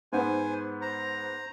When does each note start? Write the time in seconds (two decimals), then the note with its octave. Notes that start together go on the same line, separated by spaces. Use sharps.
0.13 G#2 B3 C5 G#5
0.81 C5 A#5